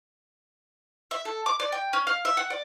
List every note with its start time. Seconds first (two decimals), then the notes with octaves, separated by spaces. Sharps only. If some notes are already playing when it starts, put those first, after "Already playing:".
1.11 E5
1.25 A4
1.46 D6
1.60 D5
1.72 G5
1.93 C#4
2.07 F5
2.25 E5
2.37 F#5
2.50 D5